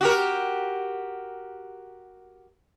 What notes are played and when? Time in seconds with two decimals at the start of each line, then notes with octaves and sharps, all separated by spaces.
0.01 F#4 G4 A#4